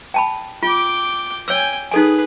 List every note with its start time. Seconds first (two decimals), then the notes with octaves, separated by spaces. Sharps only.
0.14 G5 A5 B5
0.63 F4 G5 D6
1.48 C#5 G5 G#5 E6
1.91 D#4 G#4 A4 B4 G#5